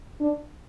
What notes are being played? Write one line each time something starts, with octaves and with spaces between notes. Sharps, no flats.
D4